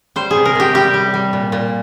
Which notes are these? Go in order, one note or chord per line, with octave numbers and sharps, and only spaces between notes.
G3 C5
C3 G#4
A#4
C3 G4
G3 G4
G3
G3
A#2
A#2